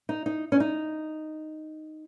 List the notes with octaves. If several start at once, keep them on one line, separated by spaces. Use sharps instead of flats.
D#4
D#4
C#4
D#4